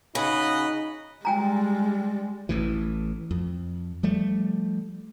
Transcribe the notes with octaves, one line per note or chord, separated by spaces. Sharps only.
C#3 D#4 F#4 D#5 B5
G3 G#3 G5 G#5 A#5
A1 A2 E3
F2
F3 G3 A3